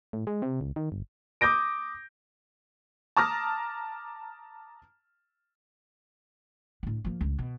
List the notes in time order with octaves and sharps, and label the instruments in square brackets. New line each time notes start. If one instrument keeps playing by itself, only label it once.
[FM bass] A2
G#3
C3
C#2
D#3
G1
[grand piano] D6 D#6 G6 A#6 D7
[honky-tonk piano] A5 A#5 D6 D#6 F6 A#6
[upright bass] A2 D4
F3 A#3
C#2 G2
B2